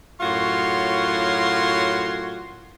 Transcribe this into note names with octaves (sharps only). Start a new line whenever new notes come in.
F#2 A2 F4 F#4 C#5 C6